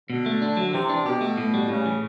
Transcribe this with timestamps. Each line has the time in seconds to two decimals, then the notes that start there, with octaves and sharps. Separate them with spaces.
0.09 B2 D3
0.26 A3
0.42 D4
0.57 F#3
0.73 C3 E3
0.90 D4
1.05 B2 G4
1.21 A3
1.38 A2
1.54 G3
1.69 A2 C#3
1.86 E3